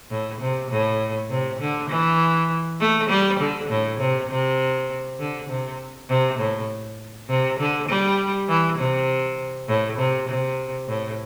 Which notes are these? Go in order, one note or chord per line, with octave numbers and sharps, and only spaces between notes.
A2
C3
A2
C3
D3
E3
A3
G3
D3
A2
C3
C3
D3
C3
C3
A2
C3
D3
G3
E3
C3
A2
C3
C3
A2